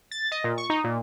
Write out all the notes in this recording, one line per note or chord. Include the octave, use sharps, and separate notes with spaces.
A6
D#5
A#2
C#6
D#4
A#2